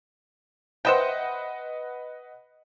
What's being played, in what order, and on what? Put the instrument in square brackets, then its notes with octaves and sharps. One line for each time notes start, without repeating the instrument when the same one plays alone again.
[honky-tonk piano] B4 D#5 F#5 [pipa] C5 E5 G5